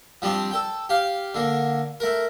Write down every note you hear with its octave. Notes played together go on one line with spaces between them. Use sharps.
F3 G3 C4 D4
A4 G5
G4 F5
D3 A#3
A3 A#4